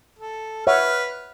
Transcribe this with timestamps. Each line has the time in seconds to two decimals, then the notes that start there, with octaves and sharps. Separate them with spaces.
0.19 A4
0.67 B4 C#5 E5 F#5 F6